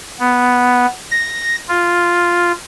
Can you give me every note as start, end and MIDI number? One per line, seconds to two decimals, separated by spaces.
0.19 0.86 59
1.10 1.55 94
1.69 2.52 65